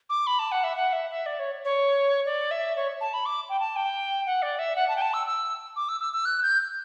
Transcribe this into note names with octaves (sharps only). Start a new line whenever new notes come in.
D6
B5
A5
F#5
E5
F#5
E5
E5
D5
C#5
C#5
D5
E5
C#5
A5
B5
D6
G5
A5
G5
F#5
D5
E5
F#5
A5
G5
A5
E6
E6
D6
E6
E6
E6
F#6
G6